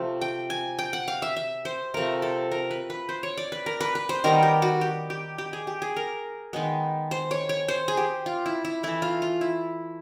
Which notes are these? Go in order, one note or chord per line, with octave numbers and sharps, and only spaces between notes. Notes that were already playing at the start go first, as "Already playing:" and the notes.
Already playing: C3 F3 A3
G5
G#5
G5
F#5
F5
E5
E5
C5
C3 F3 A3 A#4
A4
A#4
B4
B4
C5
C#5
D5
B4
A#4
B4
B4
C5
D#3 G3 B3 A#4
G4
F#4
G4
G4
G4
G#4
G4
G#4
A#4
D#3 G#3 B3
C5
C#5
C#5
C5
G#4
G4
F4
E4
E4
E3 A3 E4
F4
F4
E4